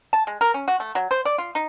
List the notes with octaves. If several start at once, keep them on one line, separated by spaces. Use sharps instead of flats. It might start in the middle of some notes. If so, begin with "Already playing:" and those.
A5
G#3
A#4
C#4
F#4
A3
F#3
C5
D5
F4
D#4